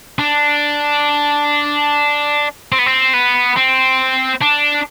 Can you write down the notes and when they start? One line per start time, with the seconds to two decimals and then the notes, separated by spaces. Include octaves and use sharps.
0.19 D4
2.72 C4
2.79 B3
2.86 C4
3.14 B3
3.57 C4
4.41 D4